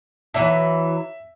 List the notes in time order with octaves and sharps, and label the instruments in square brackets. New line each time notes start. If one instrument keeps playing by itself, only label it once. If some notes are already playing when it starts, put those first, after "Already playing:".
[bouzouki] D3 E3 F#3 [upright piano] E5